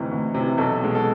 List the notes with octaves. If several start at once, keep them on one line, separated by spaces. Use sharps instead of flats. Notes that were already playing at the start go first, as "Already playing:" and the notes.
Already playing: D2 C3 E3 D#4
D2
C3 E3
B1 A4
B2 G#3
A4